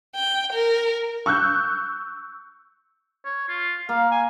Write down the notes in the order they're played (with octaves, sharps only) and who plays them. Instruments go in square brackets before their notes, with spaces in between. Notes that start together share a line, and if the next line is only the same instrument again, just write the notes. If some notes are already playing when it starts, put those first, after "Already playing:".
[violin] G5
A#4
[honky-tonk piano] C#6 E6 F#6 G6
[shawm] C#5
F4
[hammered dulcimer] A#3 [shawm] F5
[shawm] G#5